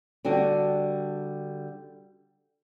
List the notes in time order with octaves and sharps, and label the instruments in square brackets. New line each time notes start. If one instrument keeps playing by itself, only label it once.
[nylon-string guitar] D3 G3 D4 F#4 G4